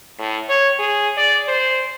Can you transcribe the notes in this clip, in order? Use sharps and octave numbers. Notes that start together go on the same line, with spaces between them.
A2
C#5
G#4
D5
C5